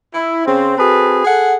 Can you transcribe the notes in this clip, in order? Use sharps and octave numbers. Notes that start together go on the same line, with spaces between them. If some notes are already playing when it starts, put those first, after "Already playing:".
E4
C#3 C4
C4 F#4 G#4 A4 B4
G#4 A4 F#5